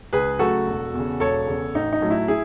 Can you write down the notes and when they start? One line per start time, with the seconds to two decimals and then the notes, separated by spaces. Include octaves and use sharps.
0.13 C#2 G#4 B4
0.39 C#3 F#3 A3 F#4 A4
0.67 E1
0.94 E2 C#3
1.20 E1 A4 C#5
1.47 E2 C#3
1.74 A1 D#4
1.93 D#4
2.01 A2 F#3 A3
2.10 E4
2.28 E4 G#4